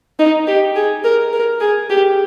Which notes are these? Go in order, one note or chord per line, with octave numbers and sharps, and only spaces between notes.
D#4
G4
G#4
A#4
A#4
G#4
G4